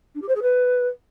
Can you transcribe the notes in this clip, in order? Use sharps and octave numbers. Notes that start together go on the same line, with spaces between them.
D4
G4
C5
G#4
B4